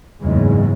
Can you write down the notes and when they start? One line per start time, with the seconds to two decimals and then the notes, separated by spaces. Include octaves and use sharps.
0.22 F#1 E2 G#2 C#3 G#3